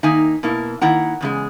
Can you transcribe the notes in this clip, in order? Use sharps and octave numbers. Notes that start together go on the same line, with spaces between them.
D#3 A#3 D#4 E5 G#5
B2 A#3 E4
D#3 A#3 E4 F#5 A#5
E2 C#3 G#3